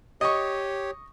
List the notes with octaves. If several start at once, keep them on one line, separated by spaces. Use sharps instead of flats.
G4 C#5 D#5 C#6